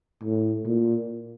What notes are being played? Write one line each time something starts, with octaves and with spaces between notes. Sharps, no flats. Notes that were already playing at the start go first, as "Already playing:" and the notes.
A2
A#2